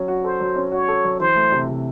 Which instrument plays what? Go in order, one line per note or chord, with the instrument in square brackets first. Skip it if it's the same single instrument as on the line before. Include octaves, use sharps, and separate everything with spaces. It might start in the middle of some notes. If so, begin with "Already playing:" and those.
Already playing: [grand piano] F#3 C#4
F#4
[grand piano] A4 [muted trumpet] C5
[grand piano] F#3
C#4
[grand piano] F#4 [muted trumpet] C#5
[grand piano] A4
F#3
[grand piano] E3 [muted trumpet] C5
[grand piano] A3
C3
C3